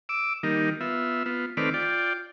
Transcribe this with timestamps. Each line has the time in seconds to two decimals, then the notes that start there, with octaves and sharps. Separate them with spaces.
0.09 D6 E6
0.43 D#3 G3 A#3 D#4
0.81 B3 F4 E5
1.26 B3 F4
1.57 D#3 A3 C4 B4 D5 F6
1.74 F4 D5 G5